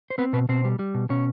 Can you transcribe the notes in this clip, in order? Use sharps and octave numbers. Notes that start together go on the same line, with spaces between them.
C5
B3 C4 B4
B2 B3 B4
B2 C4 C5
G3
G3
B2
B2 C#4 C#5